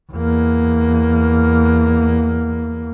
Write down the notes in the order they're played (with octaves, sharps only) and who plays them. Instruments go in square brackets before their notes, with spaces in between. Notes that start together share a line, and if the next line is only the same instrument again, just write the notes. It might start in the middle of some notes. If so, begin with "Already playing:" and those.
[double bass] E2 A#3